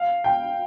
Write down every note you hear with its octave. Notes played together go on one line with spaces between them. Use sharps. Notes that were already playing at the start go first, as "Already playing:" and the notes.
Already playing: F5
G5